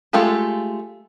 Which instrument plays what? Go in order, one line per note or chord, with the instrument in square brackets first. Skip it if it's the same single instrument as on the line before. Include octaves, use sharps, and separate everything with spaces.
[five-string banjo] G#3 A3 F4 G4 A4